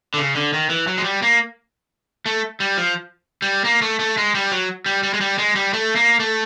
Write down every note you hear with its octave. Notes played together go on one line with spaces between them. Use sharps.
D3
C#3
D3
D#3
E3
F#3
G#3
G3
A#3
A3
G3
F3
G3
A#3
A3
A3
G#3
G3
F#3
G3
G3
G#3
G3
G#3
G3
A3
A#3
A3